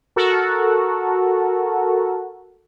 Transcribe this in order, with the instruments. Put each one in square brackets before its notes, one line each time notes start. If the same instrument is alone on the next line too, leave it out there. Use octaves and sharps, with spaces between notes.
[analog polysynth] F#4 A4 A#4